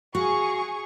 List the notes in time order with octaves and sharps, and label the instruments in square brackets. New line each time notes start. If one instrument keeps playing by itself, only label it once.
[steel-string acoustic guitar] F#4 F5 [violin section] G#4 C#6